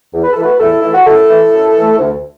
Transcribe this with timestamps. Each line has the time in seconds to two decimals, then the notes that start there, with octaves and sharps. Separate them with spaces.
0.14 E2
0.23 B4
0.33 E3 A4
0.41 A3 F#4 B4
0.59 E2 E4 A4
0.81 E3 A3 E4
0.94 F#4
1.06 F#2 E4 A4
1.30 E3 A3
1.53 F#2
1.76 E3 A3
1.99 D2